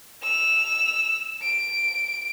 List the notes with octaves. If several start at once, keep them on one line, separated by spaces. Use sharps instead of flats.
E6 F7
D7